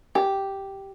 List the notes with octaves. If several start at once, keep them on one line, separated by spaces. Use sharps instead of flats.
G4